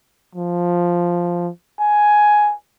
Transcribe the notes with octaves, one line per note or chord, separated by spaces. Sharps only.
F3
G#5